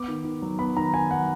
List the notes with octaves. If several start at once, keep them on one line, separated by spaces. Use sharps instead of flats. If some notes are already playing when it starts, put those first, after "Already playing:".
Already playing: B3 D6
D#3
D#3
F#3
B3 B5
D#3 A#5
D#3 G#5
F#3 F#5